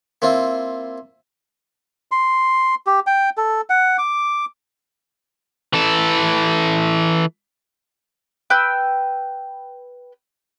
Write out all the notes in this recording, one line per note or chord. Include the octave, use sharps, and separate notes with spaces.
A#3 C4 E4 F4
C6
G4
G5
A4
F#5
D6
E3 A4
B4 G5 E6 G6